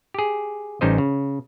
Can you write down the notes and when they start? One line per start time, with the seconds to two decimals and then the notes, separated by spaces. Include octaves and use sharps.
0.14 G4 G#4
0.81 A1 G3 C#4 D#4 C5 D#5
0.98 C#3